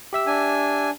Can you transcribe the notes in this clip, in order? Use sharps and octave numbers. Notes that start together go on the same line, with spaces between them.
G4 E5 E6
D4 G#5